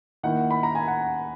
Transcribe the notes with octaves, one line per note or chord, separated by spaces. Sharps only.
D#3 A#3 E4 F#5
B5
A#5
G#5
F#5